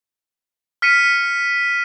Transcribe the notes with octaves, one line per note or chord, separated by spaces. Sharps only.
F6 B6 C#7 D#7